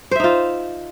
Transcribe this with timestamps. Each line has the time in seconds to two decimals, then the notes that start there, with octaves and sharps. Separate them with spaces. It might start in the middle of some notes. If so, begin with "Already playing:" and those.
0.11 C5
0.16 E5
0.20 D#4
0.24 F4